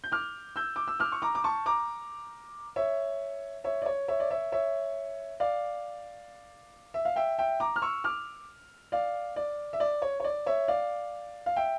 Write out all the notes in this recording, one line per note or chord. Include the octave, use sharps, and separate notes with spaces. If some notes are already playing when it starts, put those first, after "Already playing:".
G6
D6 F6
E6 G6
D6
E6
D6 F6
C#6
A#5 D6
D6
A5 C#6
A#5 D6
C#5 E5
C#5 E5
D5
C#5
C#5 E5
D5
C#5 E5
C#5 E5
D5 F5
E5
F5
E5 G5
E5 G5
A#5 D6
F6
C#6 E6
D6 F6
D5 F5
D5
E5
D5
C#5
C#5
D5
C#5 E5
D5 F5
F5
E5 G5